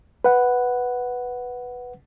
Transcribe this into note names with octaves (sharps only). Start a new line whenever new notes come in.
B4 F#5